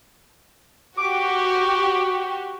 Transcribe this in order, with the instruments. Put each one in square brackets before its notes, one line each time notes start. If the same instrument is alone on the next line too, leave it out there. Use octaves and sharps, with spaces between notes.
[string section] F#4 G4 [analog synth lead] D6